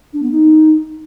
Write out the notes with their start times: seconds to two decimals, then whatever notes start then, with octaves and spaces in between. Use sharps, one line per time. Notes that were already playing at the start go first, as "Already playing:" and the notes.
0.13 D4
0.22 B3
0.32 D#4